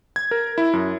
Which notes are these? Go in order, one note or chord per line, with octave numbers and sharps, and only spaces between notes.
G#6
A#4
E4
F#2